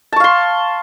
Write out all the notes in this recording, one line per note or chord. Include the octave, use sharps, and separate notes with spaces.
F5 A5 C6 C#6